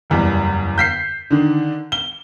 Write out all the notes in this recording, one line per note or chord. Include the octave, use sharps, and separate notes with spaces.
F#1 E2 G3
G6 B6 C7
D3 D#3
G7